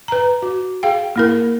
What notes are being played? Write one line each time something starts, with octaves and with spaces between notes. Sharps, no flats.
B4 A#5
F#4
G#4 F5 G5
A#3 E4 A#4